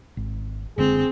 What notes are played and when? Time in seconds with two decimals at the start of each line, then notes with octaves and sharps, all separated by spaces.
0.17 G#1
0.78 F#1 D3 G#3 C4 G#4